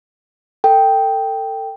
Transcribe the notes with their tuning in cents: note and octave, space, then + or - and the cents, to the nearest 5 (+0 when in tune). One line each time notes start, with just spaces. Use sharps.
A4 +30 G5 +0